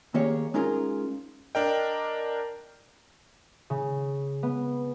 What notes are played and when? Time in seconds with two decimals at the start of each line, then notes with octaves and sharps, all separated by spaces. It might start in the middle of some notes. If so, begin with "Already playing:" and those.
0.14 D#3 A#3 G4 G#4 C#5
0.54 G#3 C#4 D#4 F4 G#4 A#4
1.55 D4 A#4 D#5 G5
3.70 C#3
4.43 B3